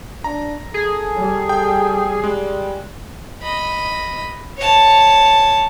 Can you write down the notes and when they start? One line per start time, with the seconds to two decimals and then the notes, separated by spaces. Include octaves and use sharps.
0.24 D4 A#5
0.74 G#4 A4
1.15 G3
1.49 G5
2.24 G3 G#3
3.42 D#5 B5
4.58 C#5 A5